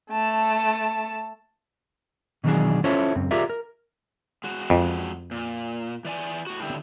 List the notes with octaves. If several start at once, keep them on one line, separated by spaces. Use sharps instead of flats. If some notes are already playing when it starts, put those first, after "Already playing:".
A3 A5
B2 D#3 E3 F#3 D4 G#4
C#4 E4 F4 A4 C5 C#5
C#2 F#2 C4
F4 G4 G#4 A#4 D5 E5
A#4
G#3 F#4
F2
A#2
E3 D5 G#5
A2 F#4
D3 E4 G4